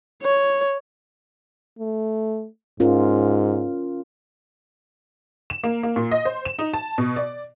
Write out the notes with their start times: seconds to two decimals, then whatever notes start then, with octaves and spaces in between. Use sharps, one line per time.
0.22 C#5
1.79 A3
2.80 G#2 C#4 F4 A#4
5.50 E7
5.64 A#3
5.83 A#3
5.96 A#2
6.11 D#5
6.25 C5
6.45 E7
6.59 D#4
6.74 A5
6.98 B2
7.16 D5